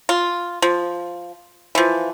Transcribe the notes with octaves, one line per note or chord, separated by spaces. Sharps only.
F4
F3
E3 F3